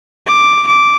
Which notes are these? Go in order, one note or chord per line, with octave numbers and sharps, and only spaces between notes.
D6
D6